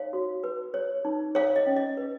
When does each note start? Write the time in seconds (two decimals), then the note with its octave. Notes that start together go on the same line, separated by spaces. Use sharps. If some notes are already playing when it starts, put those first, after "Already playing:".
Already playing: D#4 C#5 F5
0.13 F#4
0.44 B4
0.74 C#5
1.05 D#4
1.35 C#5 F5
1.56 D#5
1.66 C#4
1.76 D#5
1.97 B4